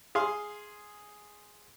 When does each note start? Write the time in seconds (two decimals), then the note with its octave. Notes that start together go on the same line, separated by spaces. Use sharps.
0.15 G#4 F5 C6